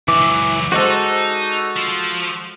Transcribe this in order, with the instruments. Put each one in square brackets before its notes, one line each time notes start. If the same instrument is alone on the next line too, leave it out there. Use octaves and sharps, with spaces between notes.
[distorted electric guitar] C#2 F#3 [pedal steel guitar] E3 [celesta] D6
[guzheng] G#3 C5 D5 [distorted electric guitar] D#4 [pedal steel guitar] F#4 A4
[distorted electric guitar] F3